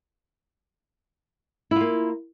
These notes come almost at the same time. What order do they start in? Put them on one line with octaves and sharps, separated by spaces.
E4 F4 A#3